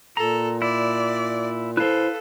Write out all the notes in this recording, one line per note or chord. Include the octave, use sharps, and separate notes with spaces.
A#2 A4 A#5
E4 D5
E4 A4 B4 C5 F5